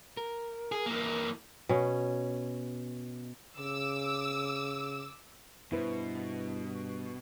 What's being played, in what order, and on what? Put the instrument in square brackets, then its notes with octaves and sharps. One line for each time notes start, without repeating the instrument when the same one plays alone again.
[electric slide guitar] A#4
[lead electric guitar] G#4
E3 A#3
[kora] B2 C#4
[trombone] C#3 [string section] D6 E6
[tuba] G2 [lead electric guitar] B2 [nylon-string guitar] E4 B4 C5